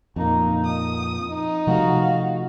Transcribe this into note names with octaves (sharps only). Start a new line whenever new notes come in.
F2 A#2 A#3 D#4
D#6
D#4
C3 F3 A3 F#4 F5